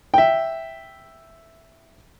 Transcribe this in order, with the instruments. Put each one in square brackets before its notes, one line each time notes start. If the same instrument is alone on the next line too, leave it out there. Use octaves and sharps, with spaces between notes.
[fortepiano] E5 G5